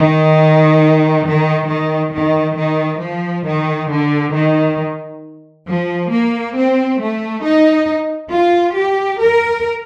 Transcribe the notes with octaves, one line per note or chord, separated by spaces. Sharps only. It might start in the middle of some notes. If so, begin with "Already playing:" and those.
Already playing: D#3
D#3
D#3
D#3
D#3
F3
D#3
D3
D#3
F3
A#3
C4
A3
D#4
F4
G4
A#4